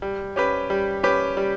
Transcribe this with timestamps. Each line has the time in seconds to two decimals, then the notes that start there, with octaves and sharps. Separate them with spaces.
0.02 G3
0.36 C#4 G4 B4
0.70 G3
1.03 C#4 G4 B4
1.37 G3